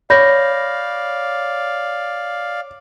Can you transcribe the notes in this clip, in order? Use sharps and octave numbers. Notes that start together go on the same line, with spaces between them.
C#5 D5 F5 B5 G6 A#6